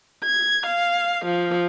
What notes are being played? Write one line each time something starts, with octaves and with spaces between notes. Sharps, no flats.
G#6
F5
F3